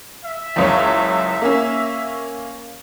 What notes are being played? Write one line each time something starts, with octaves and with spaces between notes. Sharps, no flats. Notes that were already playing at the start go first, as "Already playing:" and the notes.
E5
F#1 C#2 C#5
A#3 C#4